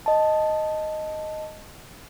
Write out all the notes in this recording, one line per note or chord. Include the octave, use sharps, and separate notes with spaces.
D#5 A5